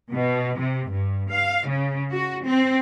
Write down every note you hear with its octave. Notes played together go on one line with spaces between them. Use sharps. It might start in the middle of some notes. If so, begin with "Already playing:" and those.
B2
C3
G2
F5
C#3
F#4
C4